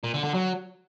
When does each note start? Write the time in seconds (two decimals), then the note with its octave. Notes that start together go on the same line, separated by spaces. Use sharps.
0.04 A#2
0.14 D3
0.24 D3
0.34 F#3